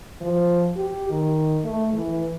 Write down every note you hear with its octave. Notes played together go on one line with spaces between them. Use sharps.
F3
G4
D#3
A3
E3